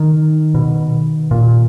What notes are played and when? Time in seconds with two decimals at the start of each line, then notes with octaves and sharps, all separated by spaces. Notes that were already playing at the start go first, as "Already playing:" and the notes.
Already playing: D#3
0.55 B2
1.31 A#2